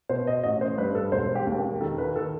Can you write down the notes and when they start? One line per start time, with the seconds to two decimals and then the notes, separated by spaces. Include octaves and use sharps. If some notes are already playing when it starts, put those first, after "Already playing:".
0.09 B2 C5
0.27 D#5
0.43 A1 D#5
0.61 C5
0.78 G2 B4
0.95 A4
1.12 E1 C5
1.35 G4
1.47 D#2
1.58 G4
1.81 D#3 A4
1.98 B4
2.16 D#3 A4